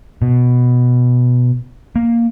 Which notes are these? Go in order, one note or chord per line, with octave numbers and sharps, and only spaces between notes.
B2
A#3